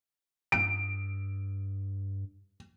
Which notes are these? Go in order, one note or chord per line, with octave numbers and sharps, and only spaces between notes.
G2 D7